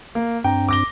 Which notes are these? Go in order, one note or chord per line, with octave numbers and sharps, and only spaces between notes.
A#3
G2 C4 D4 G5 A#5
D6 A#6 G7